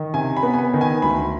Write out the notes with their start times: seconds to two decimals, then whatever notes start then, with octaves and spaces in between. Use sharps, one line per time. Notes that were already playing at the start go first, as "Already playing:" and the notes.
Already playing: D#3
0.14 C3 G#5
0.37 B5
0.43 B3
0.53 G#5
0.59 B5
0.74 D#3
0.81 G#5
1.02 D2 B5